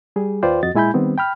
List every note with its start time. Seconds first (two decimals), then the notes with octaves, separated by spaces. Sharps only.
0.16 G3 G#4
0.43 D#2 F4 B4 C5 D5 G5
0.63 F2 F#4 D#5 A6
0.75 A#2 G#3 E4 G#5 B5 G6
0.94 D#3 G3 B3 C4
1.18 G5 B5 F6